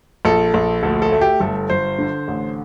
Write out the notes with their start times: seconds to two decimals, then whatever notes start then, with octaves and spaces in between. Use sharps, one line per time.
0.25 A#1 A4
0.54 A#1
0.83 D2 A4
1.02 A4
1.12 A3
1.21 G4
1.40 G1 A4
1.70 G1 C5
1.99 D3
2.28 A1